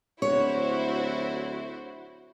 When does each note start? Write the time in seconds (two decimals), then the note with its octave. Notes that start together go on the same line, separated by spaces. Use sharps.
0.22 D1 E4 F#4 C5 C#5